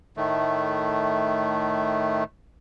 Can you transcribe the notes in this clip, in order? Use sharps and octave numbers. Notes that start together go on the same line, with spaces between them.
A2 D#3 A3